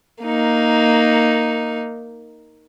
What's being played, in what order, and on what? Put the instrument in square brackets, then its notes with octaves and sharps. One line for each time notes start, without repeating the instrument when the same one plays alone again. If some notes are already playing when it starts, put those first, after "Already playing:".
[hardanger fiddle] A#3 D#4